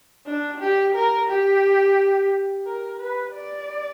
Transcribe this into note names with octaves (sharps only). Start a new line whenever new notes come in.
D4
G4
A#4
G4
A#4
B4
D5